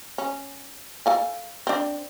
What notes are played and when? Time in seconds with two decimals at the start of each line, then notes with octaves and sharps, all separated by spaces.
0.18 C#4
1.06 A4 F5 G#5
1.67 C4 D4